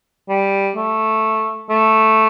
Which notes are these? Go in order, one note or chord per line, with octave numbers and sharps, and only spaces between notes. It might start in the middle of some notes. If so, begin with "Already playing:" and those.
G3
A3
A3